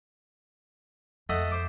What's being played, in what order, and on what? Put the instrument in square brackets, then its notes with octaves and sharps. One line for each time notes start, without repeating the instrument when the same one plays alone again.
[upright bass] F2 [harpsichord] A3 D#5 F#5
[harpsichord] C5 D6